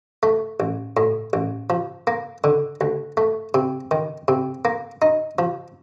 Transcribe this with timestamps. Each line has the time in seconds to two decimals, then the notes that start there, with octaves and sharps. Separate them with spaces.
0.23 A3
0.60 A1
0.97 A2
1.33 A1
1.70 F3
2.07 A#3
2.44 D3
2.81 D2
3.17 A3
3.54 C3
3.91 D#3
4.28 C3
4.65 A#3
5.02 D#4
5.39 F3